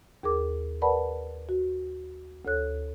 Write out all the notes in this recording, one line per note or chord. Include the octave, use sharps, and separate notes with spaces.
D#2 G#4 A#4 D6
A#4 B4 D5 F#5 A5 B5
F#4
D2 A4 C#5 F#6